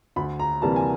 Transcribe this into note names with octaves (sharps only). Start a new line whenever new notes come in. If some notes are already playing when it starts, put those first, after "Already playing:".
D2 B5
A#5
C3 E3 G3 A#3 A5
G#5